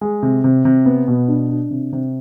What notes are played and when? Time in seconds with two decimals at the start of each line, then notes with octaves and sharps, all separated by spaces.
0.01 G#3
0.23 C3
0.44 C3
0.65 C3
0.86 B3
1.08 B2
1.28 D4
1.49 D4
1.71 C3
1.93 C3